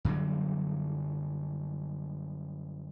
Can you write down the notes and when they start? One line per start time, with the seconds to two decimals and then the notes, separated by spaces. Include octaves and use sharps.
0.05 F#2 D3 F#3 G3